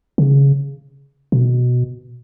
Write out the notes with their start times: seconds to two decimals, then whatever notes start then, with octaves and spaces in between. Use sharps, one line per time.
0.18 C#3
1.32 B2